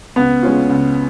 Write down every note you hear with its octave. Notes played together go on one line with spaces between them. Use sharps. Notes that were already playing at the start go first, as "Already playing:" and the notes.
C#2 B3
C#3 G#3 C#4 F4
C#2